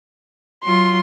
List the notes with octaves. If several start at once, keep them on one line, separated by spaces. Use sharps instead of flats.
F#3 F4 C6